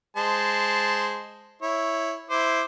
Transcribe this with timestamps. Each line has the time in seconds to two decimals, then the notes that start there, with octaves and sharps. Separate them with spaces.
0.17 G#3 C5 A5
1.62 E4 C#5
2.30 E4 C5 D6